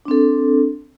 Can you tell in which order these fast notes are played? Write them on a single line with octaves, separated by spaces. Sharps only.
D4 C4 A4